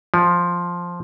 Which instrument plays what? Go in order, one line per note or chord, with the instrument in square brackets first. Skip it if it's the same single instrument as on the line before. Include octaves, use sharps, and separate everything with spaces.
[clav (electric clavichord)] F3